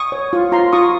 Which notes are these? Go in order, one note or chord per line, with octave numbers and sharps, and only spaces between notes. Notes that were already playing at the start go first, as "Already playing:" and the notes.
Already playing: C#6 D#6
C#5
F4
F4 A#5 C6
F4 C#6 D#6